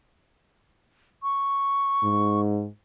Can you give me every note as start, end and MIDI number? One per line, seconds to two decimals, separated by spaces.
1.23 2.40 85
2.03 2.67 44